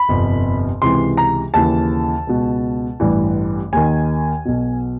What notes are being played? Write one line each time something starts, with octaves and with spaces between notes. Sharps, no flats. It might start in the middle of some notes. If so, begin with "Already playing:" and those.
Already playing: B5
G1 F2 C3
C#2 C3 E3 C6
A#5
D#2 C#3 E3 A5
C#2 B2
A1 G2 E3
D#2 D#3 G#5
B1 B2